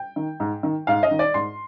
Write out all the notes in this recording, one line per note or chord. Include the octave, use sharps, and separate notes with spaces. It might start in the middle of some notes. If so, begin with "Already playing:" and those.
Already playing: G5
D#3
G#2
D#3
G#2 F5
D#5
D#3
D5
G#2 C6